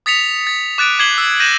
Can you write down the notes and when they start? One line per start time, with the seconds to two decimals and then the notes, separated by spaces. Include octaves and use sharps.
0.06 D#6 A6 B6 C#7 F7
0.47 A6
0.78 D6 F#6 A6 D7 D#7
0.99 D6 G#6 C7 F#7 G7
1.18 E6
1.40 G6 A#6 D#7 E7 F#7